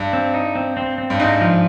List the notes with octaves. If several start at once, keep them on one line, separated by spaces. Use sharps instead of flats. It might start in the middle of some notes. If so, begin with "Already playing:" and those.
Already playing: G2
C4
D#4
C4
C4
C4
G2
G#2 D#4
F3